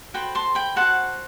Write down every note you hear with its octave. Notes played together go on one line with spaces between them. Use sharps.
F#4 A4 C5 G5 B5
A5 C6
G5 B5
F#4 A4 C5 F#5 A5